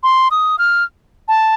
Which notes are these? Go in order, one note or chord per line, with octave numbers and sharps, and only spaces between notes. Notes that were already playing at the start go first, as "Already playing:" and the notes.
C6
D#6
F6
A5